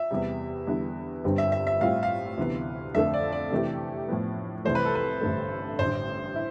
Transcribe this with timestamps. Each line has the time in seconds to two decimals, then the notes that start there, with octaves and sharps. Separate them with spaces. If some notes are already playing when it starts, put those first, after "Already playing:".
Already playing: E5
0.11 E2 C3 G3
0.67 E2 D3 G3 B3 E4
1.24 G1 G2 D3 G3 C4
1.38 E5
1.52 E5
1.67 E5
1.81 A2 G3 C4 F4 F5
2.03 F5
2.37 D2 C3 E3 B3
2.94 F2 D3 A3 D4 A4 E5
3.14 D5
3.33 D5
3.51 C3 E3 A3 D4 G4
4.08 A2 F3 B3
4.65 C2 C3 E3 A3 C5
4.75 B4
4.85 A4
4.95 B4
5.22 A1 G2 D3 A3
5.79 A1 G2 D3 C5
6.36 E4